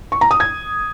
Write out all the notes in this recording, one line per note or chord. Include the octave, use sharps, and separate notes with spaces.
C#6
A#5
D#6
G#6